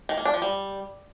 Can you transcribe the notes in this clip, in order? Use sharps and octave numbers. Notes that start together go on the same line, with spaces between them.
D#3
A#3
D4
F3
G3